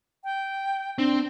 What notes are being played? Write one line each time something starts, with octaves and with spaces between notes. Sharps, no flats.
G5
C4 D4